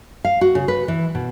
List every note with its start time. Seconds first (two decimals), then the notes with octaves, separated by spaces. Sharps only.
0.25 F5
0.41 F#4
0.55 C#3
0.68 B4
0.88 E3
1.15 B2